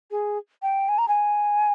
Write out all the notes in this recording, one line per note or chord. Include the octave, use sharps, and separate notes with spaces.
G#4
G5
G#5
A#5
G#5